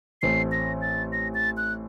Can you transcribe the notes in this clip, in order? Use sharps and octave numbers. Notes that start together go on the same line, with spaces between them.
A1 A2 A3 C4 C7
A#6
A6
A#6
A6
F#6